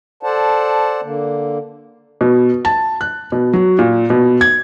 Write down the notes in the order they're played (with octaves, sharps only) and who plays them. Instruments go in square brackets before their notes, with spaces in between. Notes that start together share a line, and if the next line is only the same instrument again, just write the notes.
[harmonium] A4 C5 D5 F#5 A5
D3 A#3
[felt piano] B2
A5
F#6
B2
F#3
A#2
B2
G#6